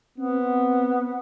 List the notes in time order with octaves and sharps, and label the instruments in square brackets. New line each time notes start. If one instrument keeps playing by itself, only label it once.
[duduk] B3 [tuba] C4